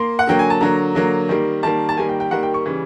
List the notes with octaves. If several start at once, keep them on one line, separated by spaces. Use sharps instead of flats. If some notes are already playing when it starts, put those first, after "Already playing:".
Already playing: A#3 C6
F#5
D3 F#3 A#3 G5
G#5
A5
D3 F#3 A#3 A#5
D3 F#3 A#3
D#3 G3 A#3
D#3 G3 A#3 A5
A5
D#3 G3 A#3 G#5
G5
G5
D#3 G3 A#3 F#5
G5
C#6
C#3 E3 G3